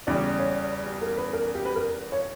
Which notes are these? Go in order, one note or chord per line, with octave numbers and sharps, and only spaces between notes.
E2 C#3 G3 D5
C#5
G4
A#4
B4
A#4
G4
B4
A#4
C#5